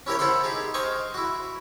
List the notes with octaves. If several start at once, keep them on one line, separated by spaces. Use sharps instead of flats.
C#4 E4 G4 A#4 C#5
E4 A4 C5 F#5 B5 C6
D#4 G4 G#4
C5 D#5 F5 G5 G#5 C#6
E4 F#4